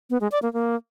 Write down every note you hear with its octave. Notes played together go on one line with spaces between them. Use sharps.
B3
G#3
D5
A#3
A#3